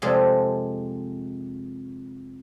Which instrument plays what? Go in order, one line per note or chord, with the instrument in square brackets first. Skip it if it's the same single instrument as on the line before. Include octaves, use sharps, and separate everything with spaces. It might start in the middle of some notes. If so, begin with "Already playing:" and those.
[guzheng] F2 C3 F3 G#3 G#4 A4